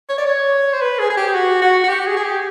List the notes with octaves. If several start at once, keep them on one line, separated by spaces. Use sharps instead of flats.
C#5
D5
C#5
C5
B4
G#4
G#4
G4
F#4
F#4
F#4
G4
G#4
G#4
G4